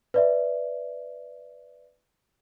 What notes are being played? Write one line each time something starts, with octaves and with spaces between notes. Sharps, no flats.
B4 D5 E5